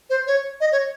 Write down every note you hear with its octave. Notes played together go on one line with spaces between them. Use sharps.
C5
C#5
D#5
C#5